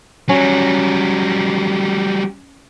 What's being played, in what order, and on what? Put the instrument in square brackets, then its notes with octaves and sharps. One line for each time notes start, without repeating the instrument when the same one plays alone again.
[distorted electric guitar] F#3 G3 [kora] C#4